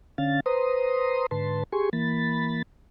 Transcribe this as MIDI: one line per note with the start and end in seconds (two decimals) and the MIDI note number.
0.18 0.40 50
0.18 0.40 61
0.18 0.40 77
0.18 0.40 93
0.46 1.26 71
0.46 1.26 72
0.46 1.26 82
0.46 1.26 84
0.46 1.26 87
1.31 1.63 44
1.31 1.63 50
1.31 1.63 71
1.31 1.63 81
1.31 1.63 84
1.72 1.89 67
1.72 1.89 68
1.72 1.89 80
1.72 1.89 84
1.72 1.89 85
1.93 2.62 52
1.93 2.62 58
1.93 2.62 83
1.93 2.62 93